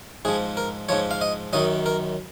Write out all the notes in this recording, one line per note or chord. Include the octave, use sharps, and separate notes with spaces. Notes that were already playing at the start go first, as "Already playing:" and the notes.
G#2 F3 G#4
A#4
G#2 F3 C#5
F5
D#5
F#2 D#3 F#3 D#5
A#4